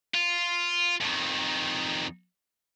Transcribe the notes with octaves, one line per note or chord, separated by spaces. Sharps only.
F4
F2 D#3